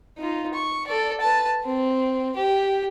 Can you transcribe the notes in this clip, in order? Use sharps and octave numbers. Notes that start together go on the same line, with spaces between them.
D#4 F4
C#6
A4 D5
B4 A5
C4
G4